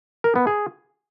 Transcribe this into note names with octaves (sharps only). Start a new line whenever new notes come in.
A#4
B3
G#4